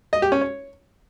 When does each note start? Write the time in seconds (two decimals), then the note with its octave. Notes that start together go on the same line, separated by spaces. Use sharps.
0.13 D#5
0.22 G4
0.32 C#4
0.41 C#5